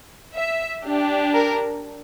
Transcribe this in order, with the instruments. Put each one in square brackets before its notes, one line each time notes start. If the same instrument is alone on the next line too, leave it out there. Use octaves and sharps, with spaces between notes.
[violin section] E5
D4 G4
A#4